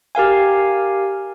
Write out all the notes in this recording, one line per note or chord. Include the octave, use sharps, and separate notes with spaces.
G4 A#4 F5 G#5